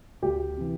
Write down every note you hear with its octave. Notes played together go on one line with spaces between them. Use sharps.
D2 G4
C3 E3